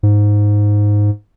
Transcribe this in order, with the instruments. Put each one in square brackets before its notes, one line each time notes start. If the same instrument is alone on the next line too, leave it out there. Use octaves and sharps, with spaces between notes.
[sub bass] G#2